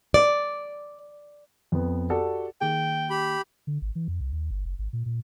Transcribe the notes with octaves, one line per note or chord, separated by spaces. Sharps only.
D5
F2 B3
F#4 G4 A4 D5 F#5
D#3 A#3 G#4 G5
G4 B5
D3
G#1
E3
F2
C2
D#2
G1
F#1
G#1
A#2
A#2